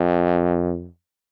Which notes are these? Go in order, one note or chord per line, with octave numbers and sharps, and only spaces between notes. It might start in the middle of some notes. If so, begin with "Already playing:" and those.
Already playing: F2